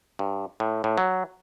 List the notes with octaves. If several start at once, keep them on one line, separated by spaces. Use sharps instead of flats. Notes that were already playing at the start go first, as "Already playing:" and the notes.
G2
A2
A2
F#3